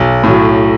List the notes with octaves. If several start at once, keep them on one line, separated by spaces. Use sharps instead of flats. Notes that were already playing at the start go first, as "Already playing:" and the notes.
Already playing: B1
A2 F#3